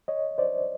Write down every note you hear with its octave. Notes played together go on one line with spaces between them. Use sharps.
C#5 D#5
C5 D5